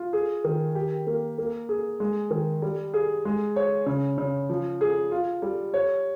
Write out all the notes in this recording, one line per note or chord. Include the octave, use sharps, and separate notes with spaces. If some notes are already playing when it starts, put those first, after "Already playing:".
Already playing: F4
G#4
D#3
G4
A#3
A#3
G#4
G#3
D#3
G3
G#4
G#3
C#5
C#3
C#3
F3
G#4
F4
G3
C#5